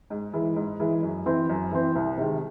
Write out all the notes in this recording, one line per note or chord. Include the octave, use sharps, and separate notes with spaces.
G#2
E3 G#3
G#2
E3 G#3
F#2
E3 C4
F#2
E3 C4
C2
C3 D#3 G#3